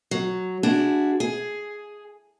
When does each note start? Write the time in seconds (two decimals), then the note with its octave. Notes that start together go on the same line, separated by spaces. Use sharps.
0.11 F#3
0.63 D4 E4 F#4 G#4
1.20 G#4